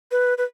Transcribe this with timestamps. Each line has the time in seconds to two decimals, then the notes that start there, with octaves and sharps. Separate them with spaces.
0.11 B4
0.38 B4